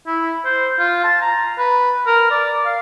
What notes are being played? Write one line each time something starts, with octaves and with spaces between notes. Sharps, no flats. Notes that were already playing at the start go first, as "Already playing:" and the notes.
E4
C5
F4
A5
A#5
B4
A#4
D5
F5